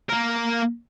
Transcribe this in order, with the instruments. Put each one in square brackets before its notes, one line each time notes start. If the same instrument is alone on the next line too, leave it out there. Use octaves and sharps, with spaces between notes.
[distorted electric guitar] A#3 A#4